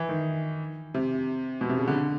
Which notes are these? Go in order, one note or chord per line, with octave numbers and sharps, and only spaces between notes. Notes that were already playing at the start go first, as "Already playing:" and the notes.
Already playing: E3
D#3
C3
B2
C3
C#3
D3